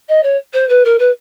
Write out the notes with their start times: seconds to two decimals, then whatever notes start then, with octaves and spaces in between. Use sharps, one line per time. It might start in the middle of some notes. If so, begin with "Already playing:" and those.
0.08 D#5
0.23 C#5
0.53 C5
0.68 B4
0.84 A#4
0.98 B4